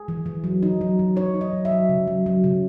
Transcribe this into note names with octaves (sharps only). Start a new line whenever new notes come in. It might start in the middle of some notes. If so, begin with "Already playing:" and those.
Already playing: G#4
E3
E3
F#3
D#4
F#3
F#3
D#4 C#5
D#4
D#5
F#3
E5
F#3
C#3
F#3
F#3
C#3